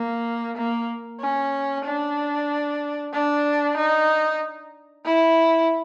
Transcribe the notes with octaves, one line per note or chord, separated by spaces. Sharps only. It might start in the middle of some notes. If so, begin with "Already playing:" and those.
Already playing: A#3
A#3
C#4
D4
D4
D#4
E4